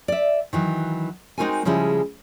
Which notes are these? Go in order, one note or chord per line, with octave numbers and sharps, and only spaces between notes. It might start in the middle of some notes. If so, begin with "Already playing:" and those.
D5 E5
D#3 E3 F#3
G#3 C4 D#4 F#4 A#4 G#5
C#3 F3 G3 G#3 E4